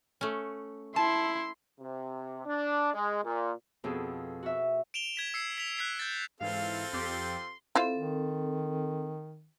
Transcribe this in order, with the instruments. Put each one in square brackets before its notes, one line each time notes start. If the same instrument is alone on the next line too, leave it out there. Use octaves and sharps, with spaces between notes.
[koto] A3 C#4
[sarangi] E4 [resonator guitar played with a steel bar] A5 [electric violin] C6
[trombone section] C3
D4
G#3
A#2
[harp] F2 B2 G#4 A4
F#4 E5
[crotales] D7 E7 F7 G7
G#6 B6 E7
E6 C7 C#7
B6 F7
F#6 G#6 B6 C7
G6 A6
[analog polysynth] G#2 E3 [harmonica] C4 F4 A4 [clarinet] F5
[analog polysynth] F2 G4 [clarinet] C6
[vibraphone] C4 A4 [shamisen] E4 F4 C5
[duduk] D#3